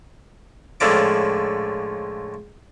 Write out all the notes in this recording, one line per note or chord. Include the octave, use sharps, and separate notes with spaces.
C#2 A2 D3 F3 D6